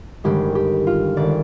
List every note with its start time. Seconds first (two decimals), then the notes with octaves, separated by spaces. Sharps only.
0.24 G1 G2 D#3 G#3 G4
0.55 G4
0.87 F4
1.17 G1 D#3 G#3 D5